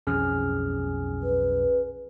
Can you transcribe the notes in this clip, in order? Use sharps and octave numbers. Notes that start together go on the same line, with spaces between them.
B1 F2 E3 C#4 G#4 F6
B4